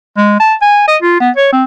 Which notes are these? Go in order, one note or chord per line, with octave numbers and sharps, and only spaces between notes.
G#3
A5
G#5
D#5
F4
B3
C#5
C4